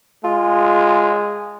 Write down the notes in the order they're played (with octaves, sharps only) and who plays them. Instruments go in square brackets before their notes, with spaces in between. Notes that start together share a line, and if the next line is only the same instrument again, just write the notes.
[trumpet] G#3 [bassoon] F4